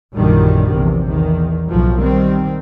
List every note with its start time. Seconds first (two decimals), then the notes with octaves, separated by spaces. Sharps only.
0.14 A#1 F#2 A#2 D3 D#3 G3
0.71 A#1 E2 C3
1.06 E2 D#3
1.68 B1 A2 F3 F#3
1.98 D#3 G3 C4